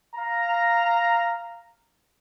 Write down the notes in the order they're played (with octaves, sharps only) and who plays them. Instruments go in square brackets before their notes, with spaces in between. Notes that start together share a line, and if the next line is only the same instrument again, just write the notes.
[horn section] F5 A#5